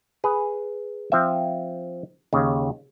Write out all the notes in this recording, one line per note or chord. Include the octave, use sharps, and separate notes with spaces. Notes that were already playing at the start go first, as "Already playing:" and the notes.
G#4 B4
F3 C4 E5
D#2 C#3